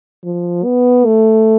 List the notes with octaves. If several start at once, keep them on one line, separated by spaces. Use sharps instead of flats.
F3
B3
A3